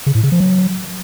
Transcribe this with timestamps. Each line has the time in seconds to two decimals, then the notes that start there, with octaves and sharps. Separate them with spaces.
0.06 C#3
0.15 A2
0.23 C#3
0.32 F3
0.40 F#3